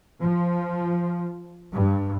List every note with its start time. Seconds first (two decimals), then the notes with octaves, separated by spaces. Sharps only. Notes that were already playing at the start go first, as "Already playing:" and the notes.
0.22 F3
1.74 G2